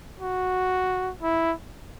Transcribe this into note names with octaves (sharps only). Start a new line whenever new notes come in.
F#4
E4